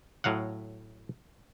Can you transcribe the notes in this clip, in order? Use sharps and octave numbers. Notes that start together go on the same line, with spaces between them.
A2 F#3 F5 F#5